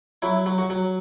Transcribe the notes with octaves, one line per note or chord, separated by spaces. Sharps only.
F#3 E4
F#3
F#4
F#3